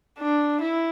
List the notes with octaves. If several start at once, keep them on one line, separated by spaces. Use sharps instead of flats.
D4
E4